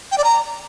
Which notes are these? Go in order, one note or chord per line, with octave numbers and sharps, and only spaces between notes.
G5
D5
A#5